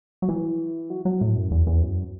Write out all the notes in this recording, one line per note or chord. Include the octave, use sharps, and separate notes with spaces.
F#3
E3
F#3
F#3
A2
F#2
E2
E2
F#2